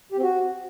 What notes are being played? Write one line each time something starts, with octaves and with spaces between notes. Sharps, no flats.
G4
C4
F#4